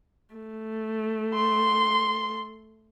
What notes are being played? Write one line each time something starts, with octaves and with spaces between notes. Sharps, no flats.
A3
C6